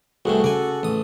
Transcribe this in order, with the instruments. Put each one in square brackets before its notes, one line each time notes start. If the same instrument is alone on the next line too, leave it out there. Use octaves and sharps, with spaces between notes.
[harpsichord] C2 G2 A3 [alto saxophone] F#4 [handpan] G#4 A4
[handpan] C#3 A4 [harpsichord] D5 G#5
[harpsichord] A1 D#6